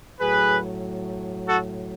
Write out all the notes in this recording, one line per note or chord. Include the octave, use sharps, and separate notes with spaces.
A2 F#3 G#4 B4
F#4 A4